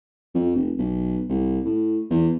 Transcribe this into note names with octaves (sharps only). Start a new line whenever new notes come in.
F2
F1
B1
C2
A2
E2